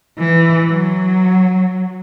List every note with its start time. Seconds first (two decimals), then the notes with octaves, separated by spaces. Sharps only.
0.19 E3
0.71 F#3